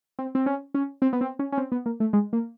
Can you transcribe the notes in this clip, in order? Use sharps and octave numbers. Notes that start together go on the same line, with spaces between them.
C4
C4
C#4
C#4
C4
B3
C4
C#4
C#4
C4
B3
A#3
A3
G#3
A#3